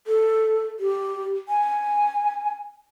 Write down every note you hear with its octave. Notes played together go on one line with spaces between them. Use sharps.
A4
G4
G#5